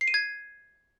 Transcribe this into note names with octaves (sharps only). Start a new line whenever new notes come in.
C7
D#7
G#6